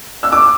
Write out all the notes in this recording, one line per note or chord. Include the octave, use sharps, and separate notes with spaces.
E6
D6